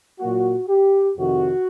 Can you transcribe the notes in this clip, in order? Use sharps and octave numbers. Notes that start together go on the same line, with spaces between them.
A#2 F#3 A#3 F#4
G4
F2 C3 D#3 F#4